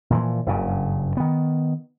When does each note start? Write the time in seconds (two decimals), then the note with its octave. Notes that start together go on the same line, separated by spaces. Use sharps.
0.10 A#2 E3 F3
0.46 F#1 G2 C#3
1.17 D#3 B3